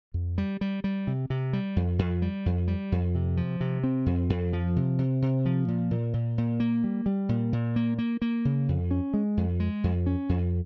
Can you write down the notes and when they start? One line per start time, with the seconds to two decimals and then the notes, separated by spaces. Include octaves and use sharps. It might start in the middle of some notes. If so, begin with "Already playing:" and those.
0.14 F2
0.38 G3
0.61 G3
0.84 G3
1.07 C3
1.30 C3
1.53 G3
1.76 F2
1.99 F2
2.22 G3
2.46 F2
2.68 G3
2.92 F2
3.15 C3
3.37 F3
3.61 C3
3.84 C4
4.06 F2
4.30 F2
4.53 F3
4.76 C3
4.99 C3
5.22 C3
5.46 F3
5.68 A#2
5.91 A#2
6.14 A#2
6.38 A#2
6.60 A#3
6.84 G3
7.06 G3
7.29 A#2
7.53 A#2
7.76 A#3
7.98 A#3
8.22 A#3
8.45 C#3
8.68 F2
8.91 C#4
9.14 G#3
9.37 F2
9.60 G#3
9.84 F2
10.06 C#4
10.29 F2